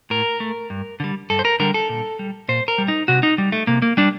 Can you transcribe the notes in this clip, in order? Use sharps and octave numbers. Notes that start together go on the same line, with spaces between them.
A2 A#4
A3
G2
D3 G3
G2 A4
C5
A#4
D3 G3 A#4
A4
A#2
G3
A#2 C5
A#4
G3
D#4
C3 F#4
D#4
G3
A3
C3 A#3
A#3
G3 D4